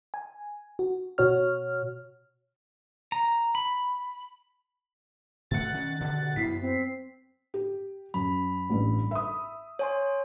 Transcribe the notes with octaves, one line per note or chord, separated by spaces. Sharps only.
G#5
F#4
B2 F#4 C#5 F6
A#5
B5
B2 A3 F#5 A6
D#3 C#4
G2 B2 D3
F#2 B3 E4 B6 C7
C4
G4
F#2 B5
A1 G2
E5 D#6
C#5 G#5 C6